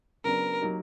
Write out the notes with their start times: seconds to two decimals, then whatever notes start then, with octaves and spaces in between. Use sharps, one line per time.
0.24 C#3 F#3 B3 D4 A#4
0.61 F#3 A#3 D#4 G4